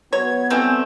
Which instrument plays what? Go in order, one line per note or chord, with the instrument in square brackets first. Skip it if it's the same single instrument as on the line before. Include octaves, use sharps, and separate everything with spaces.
[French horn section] F#3 B3 [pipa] C#5 [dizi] G#6
[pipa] E3 G3 A3 [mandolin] C4 [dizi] G#5